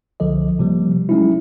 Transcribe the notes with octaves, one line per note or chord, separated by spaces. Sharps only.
C2 D3 F3 A4 D#5
C3 F3 G3 A#3
F#3 G#3 C#4 D#4 E4